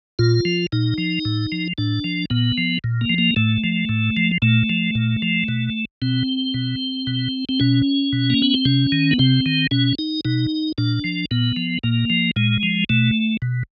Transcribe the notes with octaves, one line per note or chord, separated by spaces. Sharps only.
A#2 F4
F3
A#2 D#4
F3
A2
F3
A2 D4
F3
A#2 B3
F3
A#2
A#3
F3
A#3
A2 A3
F3
A2
F3
A#2 A3
F3
A#2
F3
B2
B2 C4
B2
B2
C4
B2 C#4
B2
A#3
B3
C4
C3 C#4
D#3
B3
C3 C4
D#3
B2 C#4
D#4
B2 D#4
A#2 D4
F3
A#2 B3
F3
A#2 A#3
F3
A#2 G#3
F3
B2 A3
B2